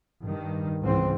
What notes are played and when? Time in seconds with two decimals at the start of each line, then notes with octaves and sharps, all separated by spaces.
0.23 G2 D#3
0.82 C#2 G#2 E3 C4